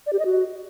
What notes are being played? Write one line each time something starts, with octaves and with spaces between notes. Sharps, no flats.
D5
G4
D#5
F#4